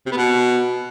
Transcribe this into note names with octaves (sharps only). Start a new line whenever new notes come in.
C3
B3
B2